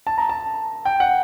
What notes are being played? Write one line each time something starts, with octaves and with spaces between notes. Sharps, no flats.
A5
A#5
A5
G5
F#5